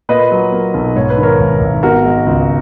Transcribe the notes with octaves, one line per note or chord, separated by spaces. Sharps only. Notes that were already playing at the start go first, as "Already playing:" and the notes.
A#2 B4 D#5
F#3
A#3
B1
G#2 C#5
B4
D#3
A#4 C#5
G#1
G#1
B2 F#4 A#4
G#3
C#2